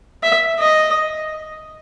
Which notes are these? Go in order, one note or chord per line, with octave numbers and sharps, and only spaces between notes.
E5
D#5